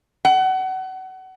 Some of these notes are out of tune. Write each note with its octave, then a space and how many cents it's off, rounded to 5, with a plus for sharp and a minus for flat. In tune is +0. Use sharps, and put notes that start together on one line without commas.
F#5 +30